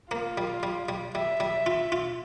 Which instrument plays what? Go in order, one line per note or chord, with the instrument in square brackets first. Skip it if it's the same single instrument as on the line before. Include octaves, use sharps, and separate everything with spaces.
[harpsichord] A#3 [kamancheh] F4
[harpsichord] G3
G3
G3
[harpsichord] G3 [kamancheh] E5
[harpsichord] G3
F4
F4